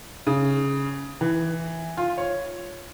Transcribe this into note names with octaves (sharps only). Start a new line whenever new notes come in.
C#3
E3
F4
C#5